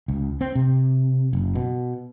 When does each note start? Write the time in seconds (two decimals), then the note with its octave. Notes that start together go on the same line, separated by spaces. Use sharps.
0.08 C#2
0.41 C4
0.55 C3
1.33 F#1
1.55 B2